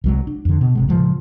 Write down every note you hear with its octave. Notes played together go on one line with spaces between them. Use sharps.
C2 F#3 G#3
D4
F2 D3
B2
G#1 C3 G#3
A2 C#3 F3 G#3